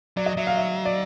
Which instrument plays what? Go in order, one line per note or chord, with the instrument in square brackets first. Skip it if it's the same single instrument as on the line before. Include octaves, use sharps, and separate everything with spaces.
[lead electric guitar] F#3 [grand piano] D5
[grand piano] D#5
[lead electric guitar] F#3 [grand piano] E5
[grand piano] F5
E5
D5